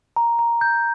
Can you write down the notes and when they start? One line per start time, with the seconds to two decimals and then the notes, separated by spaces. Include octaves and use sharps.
0.16 A#5
0.39 A#5
0.61 G6